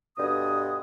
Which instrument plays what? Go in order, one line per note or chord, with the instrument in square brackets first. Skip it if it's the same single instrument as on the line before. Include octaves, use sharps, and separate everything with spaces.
[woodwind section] G2 B2 D3 D#6